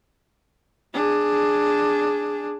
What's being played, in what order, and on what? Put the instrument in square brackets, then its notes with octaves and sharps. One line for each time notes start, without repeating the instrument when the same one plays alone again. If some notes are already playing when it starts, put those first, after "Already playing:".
[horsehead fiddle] D4 G#4